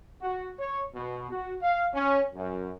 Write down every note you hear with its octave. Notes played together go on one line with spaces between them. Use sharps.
F#4
C#5
B2
F#4
F5
C#4
F#2